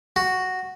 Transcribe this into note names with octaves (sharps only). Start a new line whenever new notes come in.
F#4